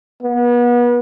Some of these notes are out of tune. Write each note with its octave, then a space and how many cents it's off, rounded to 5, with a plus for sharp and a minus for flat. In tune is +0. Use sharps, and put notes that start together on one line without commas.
B3 -35